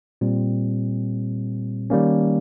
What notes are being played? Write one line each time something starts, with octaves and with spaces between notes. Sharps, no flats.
A#2 G3 C4
D#3 G3 A#3 C#4